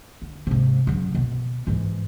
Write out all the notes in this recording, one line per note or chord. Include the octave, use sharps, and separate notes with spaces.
D3
G#2 C3
C#3 F#3
B2 B3
G#2 E3